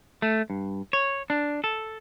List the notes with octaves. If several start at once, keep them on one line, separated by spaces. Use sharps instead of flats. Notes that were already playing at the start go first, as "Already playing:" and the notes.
A3
G2
C#5
D4
A4